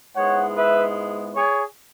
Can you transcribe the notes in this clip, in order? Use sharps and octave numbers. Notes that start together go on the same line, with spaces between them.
G#2 G#3 B3 E4 C#5 F#5
B4 E5
G#4 C#5